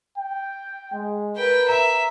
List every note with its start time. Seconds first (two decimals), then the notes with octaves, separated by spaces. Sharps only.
0.18 G5
0.93 G#3
1.37 A#4 B4 G5
1.69 E5 A#5